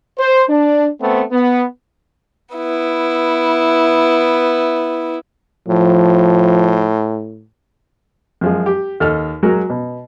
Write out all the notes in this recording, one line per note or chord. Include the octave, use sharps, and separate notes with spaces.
C5
D4
A3 B3 C4
B3
B3 E4
A2 F3
F#2 F3 G#3
G4
D#2 A4 D#5 F6
F#3 G#3 F#4 A#4
B2